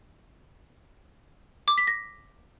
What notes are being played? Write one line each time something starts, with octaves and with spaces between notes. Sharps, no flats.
D6
B6
A#6